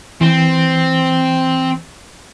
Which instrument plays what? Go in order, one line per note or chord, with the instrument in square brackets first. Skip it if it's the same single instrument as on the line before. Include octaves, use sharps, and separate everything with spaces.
[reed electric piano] E3 [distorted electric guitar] C4